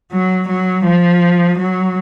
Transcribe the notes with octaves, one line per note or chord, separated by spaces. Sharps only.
F#3
F#3
F3
F#3